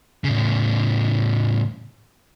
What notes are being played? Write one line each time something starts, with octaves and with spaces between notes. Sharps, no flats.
A2 C#3